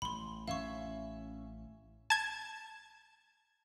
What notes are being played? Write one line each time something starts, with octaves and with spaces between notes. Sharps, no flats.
A1 B5 C6
C#4 E5 F5 C#6
A5 G#6